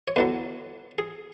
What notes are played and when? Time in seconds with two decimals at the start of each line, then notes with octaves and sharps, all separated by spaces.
0.08 C#5
0.16 E2 D3 F#3 B4
0.98 G#4